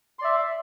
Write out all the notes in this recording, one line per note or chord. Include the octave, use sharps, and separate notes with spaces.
D5 E5 C6